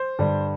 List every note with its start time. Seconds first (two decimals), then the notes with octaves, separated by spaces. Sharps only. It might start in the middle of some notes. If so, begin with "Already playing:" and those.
Already playing: C5
0.19 G2 D3 G3